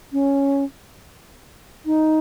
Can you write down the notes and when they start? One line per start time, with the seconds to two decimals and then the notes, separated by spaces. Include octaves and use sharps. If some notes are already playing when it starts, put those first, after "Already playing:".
0.13 C#4
1.86 D#4